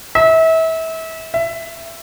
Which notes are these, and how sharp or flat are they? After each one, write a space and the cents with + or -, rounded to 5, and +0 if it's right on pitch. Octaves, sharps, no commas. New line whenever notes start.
E5 -30
E5 +15